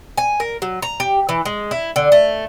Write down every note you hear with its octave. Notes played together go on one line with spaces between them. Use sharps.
G#5
A#4
F#3
A#5
G4
E3
G#3
E4
D3
A3